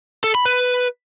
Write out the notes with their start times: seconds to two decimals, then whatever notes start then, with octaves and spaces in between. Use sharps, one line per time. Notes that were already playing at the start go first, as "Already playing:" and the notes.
0.24 A4
0.35 B5
0.45 B4